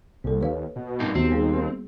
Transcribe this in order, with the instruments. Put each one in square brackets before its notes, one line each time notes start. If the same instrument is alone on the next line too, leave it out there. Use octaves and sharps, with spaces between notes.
[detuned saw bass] C2 [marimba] A#3 A4
[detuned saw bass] D#2 [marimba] B4 C#5 F5
[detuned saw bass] B2
[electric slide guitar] G2 A#3 D#4 [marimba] C4
[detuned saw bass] D#2 [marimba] B2 B3 F#4 [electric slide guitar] C4
[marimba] G3 A#3 G#4